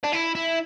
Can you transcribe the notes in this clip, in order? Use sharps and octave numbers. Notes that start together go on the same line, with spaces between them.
D4
E4
E4